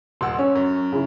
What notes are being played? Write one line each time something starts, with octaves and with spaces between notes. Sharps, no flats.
D#1 F#5 C6 E6
C#4 C#5
F#2
C#3 E4